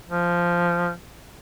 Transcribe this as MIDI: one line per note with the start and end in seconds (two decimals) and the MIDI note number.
0.08 0.92 53